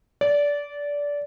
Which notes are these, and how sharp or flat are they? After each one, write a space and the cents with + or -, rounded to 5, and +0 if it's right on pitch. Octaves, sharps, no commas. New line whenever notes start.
D5 -20